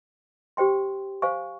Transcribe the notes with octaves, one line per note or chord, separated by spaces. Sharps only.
G4 C5 G5 C6
C5 F5 G#5 C#6